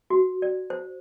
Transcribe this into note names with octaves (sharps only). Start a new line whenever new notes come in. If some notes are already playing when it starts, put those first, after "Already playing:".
F#4
D5
C5